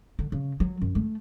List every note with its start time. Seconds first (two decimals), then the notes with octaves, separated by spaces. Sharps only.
0.19 D3
0.32 C#3
0.60 F#3
0.82 F#2
0.95 A3